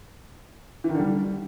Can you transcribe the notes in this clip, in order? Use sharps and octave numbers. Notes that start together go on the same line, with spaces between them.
E3
D#3
D3
G3